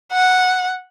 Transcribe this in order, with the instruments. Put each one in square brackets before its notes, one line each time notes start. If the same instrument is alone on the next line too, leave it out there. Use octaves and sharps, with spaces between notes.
[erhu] F#5